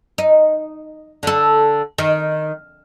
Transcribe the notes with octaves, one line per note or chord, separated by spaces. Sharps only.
D#4
D3 A4
D#3